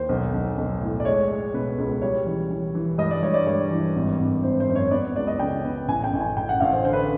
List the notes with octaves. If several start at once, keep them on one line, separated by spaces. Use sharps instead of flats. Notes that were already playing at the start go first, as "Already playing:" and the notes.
Already playing: D#2 C5
B1
B1
B1
A2
D5
G#3 C#5
G#3
B2 B4
C#2
G3 C#5
E3
E3
E3
G2 D#5
D5
G2 C#5
D5
G2 C#5
E3
G#1
G#1
G#1 C5
C5
F#2
C#5
B3 D5
C#2 D5
D#5
C#3 G5
B3
A1 G#5
G5
A1
G#5
A1 G5
F#5
A1 F5
C5
D3 C5
B4